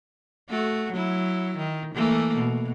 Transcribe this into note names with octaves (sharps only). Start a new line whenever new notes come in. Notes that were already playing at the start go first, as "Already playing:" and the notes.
A3 F#4
F#3 E4
D#3
E3 A3 A#3
B2